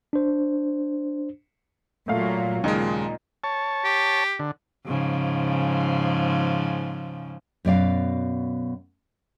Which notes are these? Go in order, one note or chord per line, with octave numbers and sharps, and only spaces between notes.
D4 C5
A#2 F#3 A3 F5
D#2 A#2 C#3 G#3 D#4
C#5 A5
G4
D3
G#2 C#3 F3
F#2 B2 D5 F5